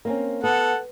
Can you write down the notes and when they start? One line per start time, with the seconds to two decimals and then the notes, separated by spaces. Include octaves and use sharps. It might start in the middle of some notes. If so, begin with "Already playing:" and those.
0.05 A#3 C4 C#4
0.44 B3 A4 F#5